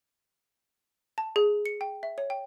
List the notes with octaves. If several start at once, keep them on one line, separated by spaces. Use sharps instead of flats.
A5
G#4
C#7
G5
E5
C#5
G5